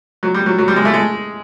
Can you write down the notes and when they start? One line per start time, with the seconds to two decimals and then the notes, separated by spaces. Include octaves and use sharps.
0.23 F#3
0.34 G3
0.46 F#3
0.58 F#3
0.68 G3
0.76 G#3
0.85 A3
0.94 G#3